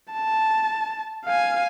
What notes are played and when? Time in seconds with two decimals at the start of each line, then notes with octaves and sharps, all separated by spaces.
0.13 A5
1.25 F5 G#5